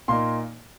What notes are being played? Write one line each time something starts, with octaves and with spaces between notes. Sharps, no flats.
A#2 A#3 D#4 C6